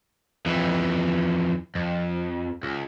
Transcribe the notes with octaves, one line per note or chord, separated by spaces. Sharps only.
F2 E3
F2
C#2